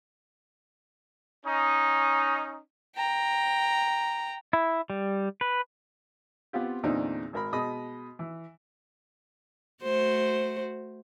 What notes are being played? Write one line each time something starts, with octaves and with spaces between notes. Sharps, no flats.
C#4 D#4
G5 A#5
E4
G3
B4
B3 C4 F4 G4
E2 A#2 D3 C4 D4 D#4
G#1 A#4 B5
B2 G#3 D#5 B5 D#6
E3
A3 F#4 C5